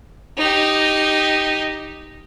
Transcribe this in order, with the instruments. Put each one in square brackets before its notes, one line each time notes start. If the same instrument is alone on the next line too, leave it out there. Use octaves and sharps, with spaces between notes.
[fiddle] D#4 G4